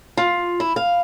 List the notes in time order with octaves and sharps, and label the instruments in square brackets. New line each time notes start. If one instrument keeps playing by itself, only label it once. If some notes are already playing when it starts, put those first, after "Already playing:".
[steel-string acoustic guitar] F4
E4
F5